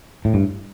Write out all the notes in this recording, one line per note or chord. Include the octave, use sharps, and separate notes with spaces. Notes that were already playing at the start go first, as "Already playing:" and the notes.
A2
G2